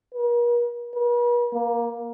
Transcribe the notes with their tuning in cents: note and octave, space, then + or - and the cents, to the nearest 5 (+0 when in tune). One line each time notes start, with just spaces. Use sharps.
A#4 +45
B4 -45
A#3 +15